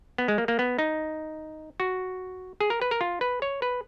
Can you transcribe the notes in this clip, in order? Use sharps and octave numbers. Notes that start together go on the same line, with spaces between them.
B3
G#3
A#3
A#3
B3
D#4
F#4
G#4
A#4
B4
A#4
F4
B4
C#5
B4